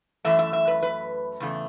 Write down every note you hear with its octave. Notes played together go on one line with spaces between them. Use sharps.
F#2 E3 A3 E5
E5
E5
B4
B4
E2 C#3 A3